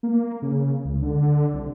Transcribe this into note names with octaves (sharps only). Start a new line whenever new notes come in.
A#3
C#3
C#2
D3
C2